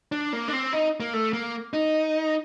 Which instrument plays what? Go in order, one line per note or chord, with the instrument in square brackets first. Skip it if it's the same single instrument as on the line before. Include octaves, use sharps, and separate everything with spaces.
[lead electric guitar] D4
A#3
D4
C4
D#4
A#3
A3
A#3
D#4